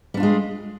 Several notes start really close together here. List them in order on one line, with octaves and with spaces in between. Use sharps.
G3 D4 F4 G#3